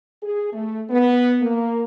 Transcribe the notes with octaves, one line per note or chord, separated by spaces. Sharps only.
G#4
A3
B3
A#3